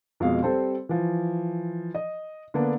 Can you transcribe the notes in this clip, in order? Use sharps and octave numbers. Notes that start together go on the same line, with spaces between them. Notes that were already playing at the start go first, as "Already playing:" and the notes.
F2 B2 G#3 F5
G3 C4 A4 C5
E3 F3
D#5
D3 A#3 B3 D4